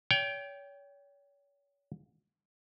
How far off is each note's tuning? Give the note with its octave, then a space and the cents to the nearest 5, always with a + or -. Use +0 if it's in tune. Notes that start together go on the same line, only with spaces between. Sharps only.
C#5 +35 G5 +0